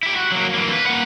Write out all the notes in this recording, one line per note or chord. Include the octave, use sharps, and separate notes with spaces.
E4 G4
F#4
F#3 A#3
E3 A#3
B4
A#3 F#5